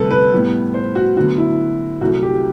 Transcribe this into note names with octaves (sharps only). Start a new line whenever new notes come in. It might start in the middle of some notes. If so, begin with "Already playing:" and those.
Already playing: D2 C3 G3 A4 B4
B4
A2 G3 B3
C5
F#4
D2 D3 F#3 B3 F#4
E4
C2 C3 F#3 A3 F#4
G4